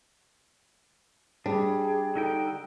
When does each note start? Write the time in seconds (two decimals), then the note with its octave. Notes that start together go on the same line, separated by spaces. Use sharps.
1.46 G3 D4 G#4
2.15 D3 D#4 A4 G5